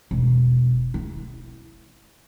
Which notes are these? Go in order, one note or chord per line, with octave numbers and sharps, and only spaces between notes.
E1
E4